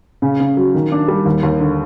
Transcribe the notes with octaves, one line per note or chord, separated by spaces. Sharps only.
C#3
C#3
F#3
D#3
D4
G3
D#2
D#2
D3